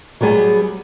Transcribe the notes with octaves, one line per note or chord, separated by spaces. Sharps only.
F#3 G3 B3 G#4